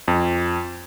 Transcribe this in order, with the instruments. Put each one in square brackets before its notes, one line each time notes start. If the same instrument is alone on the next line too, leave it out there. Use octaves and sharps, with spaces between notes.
[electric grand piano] F2